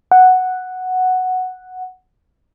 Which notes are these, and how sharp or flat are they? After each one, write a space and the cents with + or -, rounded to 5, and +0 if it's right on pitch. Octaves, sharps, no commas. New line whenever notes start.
F#5 +0